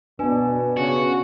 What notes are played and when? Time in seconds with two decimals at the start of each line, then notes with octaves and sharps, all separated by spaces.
0.19 B2 B3 D4 B4 G#5
0.77 C#3 F#4